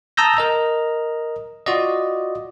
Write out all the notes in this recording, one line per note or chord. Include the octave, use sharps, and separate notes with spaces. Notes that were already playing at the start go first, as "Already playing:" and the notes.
A5 A#5 D#6 E6 G6 A#6
A#4 D#5 A#5
F4 F#4 D5 D#5